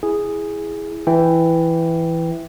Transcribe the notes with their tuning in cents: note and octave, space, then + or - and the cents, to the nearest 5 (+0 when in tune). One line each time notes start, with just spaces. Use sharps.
E4 +0 G#4 -5
E3 +5 E5 +0 G5 +0